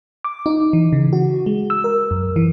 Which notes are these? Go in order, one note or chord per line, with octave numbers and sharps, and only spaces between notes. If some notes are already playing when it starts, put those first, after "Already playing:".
D6
D#4
E3
C#3
F#4
G#3
E6
A#4
F#2
E3